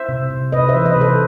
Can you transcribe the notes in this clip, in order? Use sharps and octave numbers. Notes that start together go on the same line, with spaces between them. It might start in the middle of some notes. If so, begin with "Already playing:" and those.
Already playing: C5 E5
C3
C3
C3 B4 D#5
C5 E5
E3
B4 D#5
C3
A4 C5